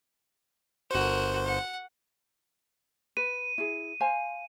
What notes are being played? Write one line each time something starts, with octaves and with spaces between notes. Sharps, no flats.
G1 F#4 A#4 C5
F#5
B4 D#7
E4 G#4
C5 F5 G#5